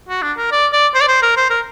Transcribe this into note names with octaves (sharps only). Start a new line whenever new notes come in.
F#4
D4
A#4
D5
D5
C5
D5
C5
A#4
C5
A#4